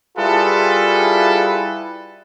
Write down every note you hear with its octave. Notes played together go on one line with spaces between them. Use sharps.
G3 E4 F4 G#4 A4 B4